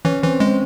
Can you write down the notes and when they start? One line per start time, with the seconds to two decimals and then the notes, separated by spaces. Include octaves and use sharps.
0.05 E3 C#4
0.23 E3 C4
0.40 G#3 C4